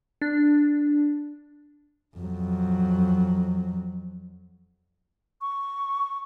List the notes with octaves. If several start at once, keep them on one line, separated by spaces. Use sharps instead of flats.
D4
F2 F#3
C#6